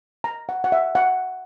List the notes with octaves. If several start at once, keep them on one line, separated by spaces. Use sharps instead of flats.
A#5
F#5
F#5
E5
F#5